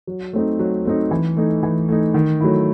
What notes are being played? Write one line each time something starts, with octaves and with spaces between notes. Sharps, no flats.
F#3
A3 C4 D#4
F#3
A3 C4 D#4
E3
A3 D#4
E3
A3 D#4
D#3
F#3 A3 E4